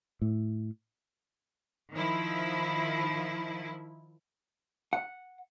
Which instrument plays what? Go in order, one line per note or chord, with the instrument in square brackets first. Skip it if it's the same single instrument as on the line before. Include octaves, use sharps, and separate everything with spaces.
[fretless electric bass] A2
[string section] D#3 F3 E4
[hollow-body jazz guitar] F#5